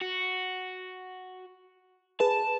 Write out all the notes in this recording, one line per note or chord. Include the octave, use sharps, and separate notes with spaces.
F#4
G#4 B4 A5